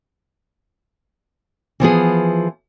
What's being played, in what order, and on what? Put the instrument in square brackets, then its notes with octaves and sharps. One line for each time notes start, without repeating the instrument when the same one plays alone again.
[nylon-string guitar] E3 F3 B3 G#4